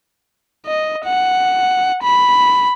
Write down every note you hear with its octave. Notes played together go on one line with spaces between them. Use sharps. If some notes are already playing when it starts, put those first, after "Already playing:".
D#5
F#5
B5